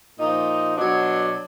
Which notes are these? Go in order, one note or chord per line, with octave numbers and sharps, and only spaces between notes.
A#2 F3 D#4
B2 F#3 D4